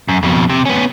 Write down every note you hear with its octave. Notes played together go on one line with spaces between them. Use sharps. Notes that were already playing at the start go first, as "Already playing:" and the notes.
F#2
F2 B2
C3
B3 C#4